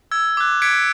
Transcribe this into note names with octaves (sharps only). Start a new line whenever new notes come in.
E6 G#6
D6 F#6
F#6 G#6 B6 C#7 D7